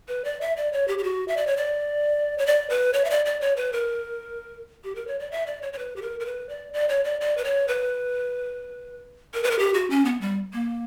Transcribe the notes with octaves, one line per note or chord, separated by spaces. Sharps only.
B4
D5
E5
D5
C#5
G4
G4
F#4
E5
D5
C#5
D5
C#5
D5
B4
C#5
E5
D5
D5
C#5
B4
A#4
G4
A#4
C#5
D5
E5
D5
C#5
C#5
B4
G4
A#4
A#4
B4
D5
D5
C#5
D5
D5
B4
C#5
B4
A#4
B4
A#4
G4
F#4
C#4
B3
G3
A#3